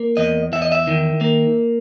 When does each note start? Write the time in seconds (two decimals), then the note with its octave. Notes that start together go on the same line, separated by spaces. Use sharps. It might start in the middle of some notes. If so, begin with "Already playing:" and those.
Already playing: A#3
0.17 E2 D#5
0.53 E2 E5
0.62 D#5
0.72 E5
0.87 D#3
1.21 A#3